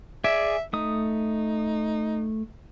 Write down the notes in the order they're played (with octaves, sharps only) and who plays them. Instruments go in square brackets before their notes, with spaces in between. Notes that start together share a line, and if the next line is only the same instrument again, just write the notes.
[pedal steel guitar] G#4 D5 G#5 [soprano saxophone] E5
[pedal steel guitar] A3 D#6 [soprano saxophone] D#4